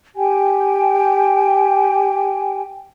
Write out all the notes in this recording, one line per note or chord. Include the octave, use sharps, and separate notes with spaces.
G4 G5 G#5